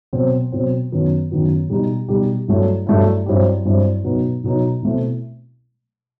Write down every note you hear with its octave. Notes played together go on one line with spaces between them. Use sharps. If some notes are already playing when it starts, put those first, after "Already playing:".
B2 F#3 C4
B2 F#3 C4
F#2 D#3 F#3 B3
F#2 D#3 F#3 B3
B2 G3 D#4 G4
B2 G3 D#4 G4
G2 F#3 A3 E4
G2 F#3 A3 E4
G2 F#3 C4 E4 G4
G2 F#3 C4 E4 G4
B2 F#3 B3 D#4
B2 F#3 B3 D#4
B2 A3 C4 E4